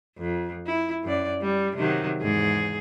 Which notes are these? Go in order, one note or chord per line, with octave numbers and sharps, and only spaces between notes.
F2
E4
F#2 D5
G3
C3 D#3 F#3
E2 G#2 G#4